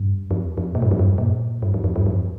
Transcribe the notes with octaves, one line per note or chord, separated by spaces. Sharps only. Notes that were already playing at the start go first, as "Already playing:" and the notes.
Already playing: G2
F2
F2
A#2
G2
F2
G2
A#2
G2
F2
F2
G2
F2